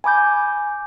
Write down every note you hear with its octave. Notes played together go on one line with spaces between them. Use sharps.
G#5 B5 D6 G6